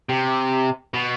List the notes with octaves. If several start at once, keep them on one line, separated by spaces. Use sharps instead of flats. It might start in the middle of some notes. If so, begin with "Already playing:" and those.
C3
B2